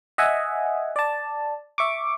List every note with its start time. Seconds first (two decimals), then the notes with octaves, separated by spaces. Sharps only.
0.18 D#5 E5 F#5 G#5
0.96 D5 A5
1.78 E5 C#6 D6